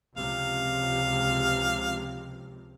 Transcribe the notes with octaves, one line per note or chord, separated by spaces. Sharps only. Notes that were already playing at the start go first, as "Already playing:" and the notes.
C#2 C3 F3 F5